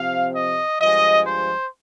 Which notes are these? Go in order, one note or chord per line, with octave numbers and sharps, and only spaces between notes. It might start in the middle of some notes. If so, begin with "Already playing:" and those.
Already playing: C3 F3 C4 F5
D#5
G2 F3 G#3 D#5
C5